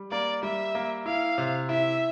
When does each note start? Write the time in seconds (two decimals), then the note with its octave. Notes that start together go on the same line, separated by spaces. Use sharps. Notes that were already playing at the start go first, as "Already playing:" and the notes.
Already playing: G3
0.12 A#3 D5
0.43 G3 E5
0.75 A#3
1.06 E4 F5
1.38 C3
1.69 E4 E5